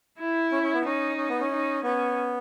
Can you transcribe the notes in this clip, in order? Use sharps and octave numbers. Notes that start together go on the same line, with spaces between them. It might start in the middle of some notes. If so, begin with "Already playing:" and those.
E4
C#4
C#4
B3
C#4 D#4
C#4
B3
C#4
D#4
B3 C#4